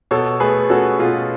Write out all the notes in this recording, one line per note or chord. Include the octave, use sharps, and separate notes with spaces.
B2 A4 C#5
A3 G#4 B4
C#4 F#4 A4
B2 F4 G#4